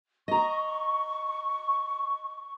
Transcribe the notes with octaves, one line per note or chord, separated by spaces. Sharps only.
D#5 A#5 C#6